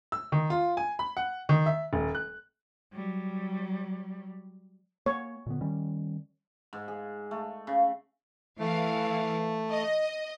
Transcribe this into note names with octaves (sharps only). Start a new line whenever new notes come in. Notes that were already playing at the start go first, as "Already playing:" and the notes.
E6
D#3
F4
G#5
B5
F#5
D#3
E5
D#1
F#6
F#3 G3
A#3 C#5
A#2 D3 B3
D#3 G3 C#4
G#2
G#4
A3
C#3
E3 A3 F5
D#5